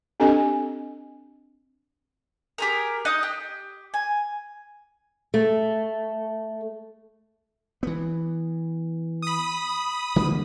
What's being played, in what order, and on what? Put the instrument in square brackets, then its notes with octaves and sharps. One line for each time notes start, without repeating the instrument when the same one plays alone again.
[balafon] C4 D4 G4 A4 D#5 G#5
[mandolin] G4 G#4 A#4
D#4 D#5 F#6
G4
G#5
[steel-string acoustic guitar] A3
[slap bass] E3 B3
[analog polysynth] B5 D#6
[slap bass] D3 G3 A#3